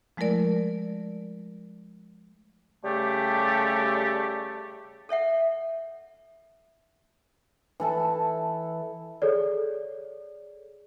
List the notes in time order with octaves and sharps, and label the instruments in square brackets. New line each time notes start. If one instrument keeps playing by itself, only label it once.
[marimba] F3 G#3 A3 E4 A#4 D5
[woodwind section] C#3 G3 A3 G4 D5
[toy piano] A4 C#5 E5 F#5
[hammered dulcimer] E3 A4 A5
[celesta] G#4 A4 C#5 D5